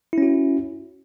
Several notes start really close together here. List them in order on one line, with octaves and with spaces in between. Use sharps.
E4 C#4 F#4